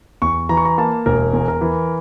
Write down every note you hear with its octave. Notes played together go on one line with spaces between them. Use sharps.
E2 C#6
E3 A#5
C#6
A#5
A#3 A5
E1 A#4
E2
A#4
E3